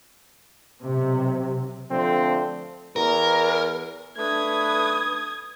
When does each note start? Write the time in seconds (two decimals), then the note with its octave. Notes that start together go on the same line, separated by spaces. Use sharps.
0.84 B1 C3
1.90 D3 F3 A3 C4
2.96 E2 A#4
4.17 A3 D4 B4 D#6 G#6